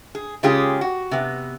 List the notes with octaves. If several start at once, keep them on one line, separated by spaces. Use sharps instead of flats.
G#4
C#3 G#3 C#4 F4 G4 G#4
F#4
C3 B3